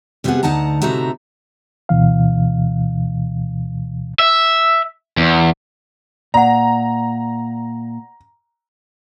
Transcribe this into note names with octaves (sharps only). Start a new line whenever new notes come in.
C3 G3 B3 F#4 G#4 F#5
D2 D#4 F#5 A5 A#5
A2 C3 D#4 F#4 E5 A#5
D2 B2 E3 F5
E5
E2
A#2 D5 F#5 A#5